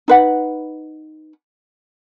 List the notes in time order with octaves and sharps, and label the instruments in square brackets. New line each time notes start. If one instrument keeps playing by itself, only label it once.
[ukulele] D#4 B4 F#5